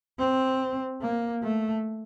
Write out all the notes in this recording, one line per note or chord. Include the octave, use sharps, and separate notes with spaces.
C4
A#3
A3